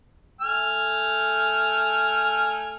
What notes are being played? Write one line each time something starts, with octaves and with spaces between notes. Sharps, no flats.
A3 G#5 F6